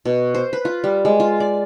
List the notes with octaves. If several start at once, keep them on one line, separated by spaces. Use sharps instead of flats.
B2
C5
B4
F4
G3
G#3
F4
D5